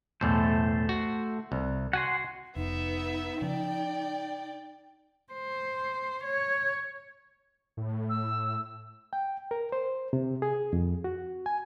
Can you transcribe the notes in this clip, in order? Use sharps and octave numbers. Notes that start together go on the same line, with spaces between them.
B1 E2 A2 A3 A4 C5
F#4
C2
F#4 F#5 G#5 C6
F1 B3 D#4 E5
C#3 F3 D5 G5
C5
C#5
A2
E6
G5
A#4
C5
C3
G#4
F2
F#4
G#5